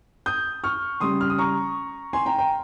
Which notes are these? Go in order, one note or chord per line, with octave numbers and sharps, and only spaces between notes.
D#6 G6
C#6 F6
C#3 G3 C6 D#6
F6
D#6
A#5 C#6
G#5 C6
G5 A#5
G5 A#5